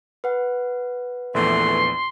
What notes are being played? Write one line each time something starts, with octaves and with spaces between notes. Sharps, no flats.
B4 F#5
A#1 E2 E3 A3 C6